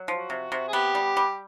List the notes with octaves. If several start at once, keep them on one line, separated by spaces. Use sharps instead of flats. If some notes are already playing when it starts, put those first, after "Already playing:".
Already playing: F#3
F3 F#4
C3
C3
G#4
B3 G4
G3
G3